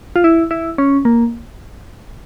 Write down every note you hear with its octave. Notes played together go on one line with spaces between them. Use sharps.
F4
E4
E4
C#4
A#3